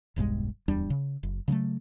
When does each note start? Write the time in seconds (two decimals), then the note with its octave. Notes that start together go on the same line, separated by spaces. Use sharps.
0.16 E1 B1 G2 G#3
0.68 D1 E2 G3 D4
0.90 C#3
1.23 F#1
1.48 C#3 F#3 G#3 A3